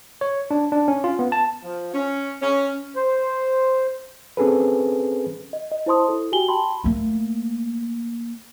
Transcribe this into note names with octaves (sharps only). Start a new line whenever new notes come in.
C#5
D4
D4
C#4
F4
B3
A5
F3
C#4
C#4
C5
C4 C#4 G#4 A4 B4
D#5
D#5
E4 C5 A5 C6 D#6
E4 A4
F#4 G4 G5 G#5 F#7 G7
G5 A5 B5 C6
A3 A#3